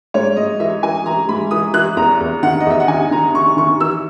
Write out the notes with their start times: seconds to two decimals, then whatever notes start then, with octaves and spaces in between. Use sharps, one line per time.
0.14 G#2 C#5
0.37 G#2 D#5
0.60 E3 E5
0.83 E3 G#5
1.06 E3 A#5
1.29 G#2 B5
1.51 E3 D#6
1.74 E3 F#6
1.97 E2 A#5
2.21 E2
2.43 D#3 F#5
2.60 D#5
2.66 E2 E5
2.80 F#5
2.88 D#3 G#5
3.11 D#3 A#5
3.34 D#3 C#6
3.57 D#3 C#6
3.81 E3 E6